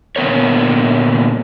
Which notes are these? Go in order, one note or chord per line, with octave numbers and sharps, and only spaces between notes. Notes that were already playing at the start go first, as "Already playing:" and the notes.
A#2 D3 B3 A#4 C#5